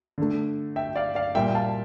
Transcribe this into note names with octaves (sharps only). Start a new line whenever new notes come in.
D3 A3
E5 G5
D5 F5
D5 F5
A#2 G3 A#3 E5 G5
F5 A5